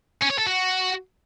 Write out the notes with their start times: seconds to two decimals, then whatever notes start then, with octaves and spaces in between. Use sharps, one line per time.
0.21 C#4
0.30 C#5
0.38 A4
0.46 F#4